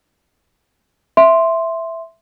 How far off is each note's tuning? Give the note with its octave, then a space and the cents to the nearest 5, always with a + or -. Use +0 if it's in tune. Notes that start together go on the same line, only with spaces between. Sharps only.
E5 +0 C6 +0